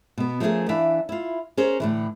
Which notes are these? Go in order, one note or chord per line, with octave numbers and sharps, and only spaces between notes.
B2 B3
F3 A3 C#4 F#4 G#4 A#4
E3 D4 E5 F5
E4 F4
C#4 G#4 A#4 C5
A2 D3 E3